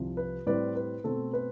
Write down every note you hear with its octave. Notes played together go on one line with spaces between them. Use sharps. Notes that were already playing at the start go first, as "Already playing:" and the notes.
Already playing: C2 C3 F3
B4
A2 G3 C4 B4 D5
B4
B2 A3 C4 A4
B4